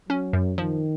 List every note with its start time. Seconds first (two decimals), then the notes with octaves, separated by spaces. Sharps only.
0.09 F#3 C#4
0.33 F#2
0.58 D#3 F3